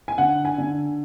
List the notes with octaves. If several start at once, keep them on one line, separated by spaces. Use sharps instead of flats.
G#5
D3 F#5
G#5
D3